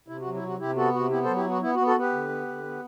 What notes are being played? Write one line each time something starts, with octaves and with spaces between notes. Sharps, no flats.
C3 E4
F#4
F#3
E4
C3 F#4
C3 E4 G4
B3 F#4 A4
C3 F#4
B3 E4 G4
A4 C5
F#3
E4 G4
B3 F#4
B3 E4
F#4
B3
F#4 A4
B3 G4 B4
D3
B3
D3
B3